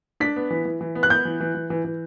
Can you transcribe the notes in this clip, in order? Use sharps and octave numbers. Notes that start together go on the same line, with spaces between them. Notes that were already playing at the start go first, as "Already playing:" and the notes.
D4 B6
B3
E3
E3
E3
B3
F#6
B3 G6
E3
E3
E3
E3
E3